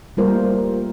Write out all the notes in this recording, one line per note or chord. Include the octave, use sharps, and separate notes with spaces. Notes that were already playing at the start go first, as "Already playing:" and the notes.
G3 A3 A#3 F4 A#4 C5